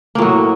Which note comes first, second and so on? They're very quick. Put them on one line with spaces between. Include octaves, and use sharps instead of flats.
A#3 A2 F#3